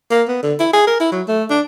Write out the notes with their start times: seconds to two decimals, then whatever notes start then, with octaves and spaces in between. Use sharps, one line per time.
0.11 A#3
0.28 B3
0.43 D3
0.60 E4
0.74 G#4
0.87 A#4
1.00 E4
1.12 F#3
1.28 A3
1.50 D4